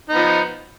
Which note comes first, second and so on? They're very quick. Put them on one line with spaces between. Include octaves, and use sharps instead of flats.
D#4 B3 F3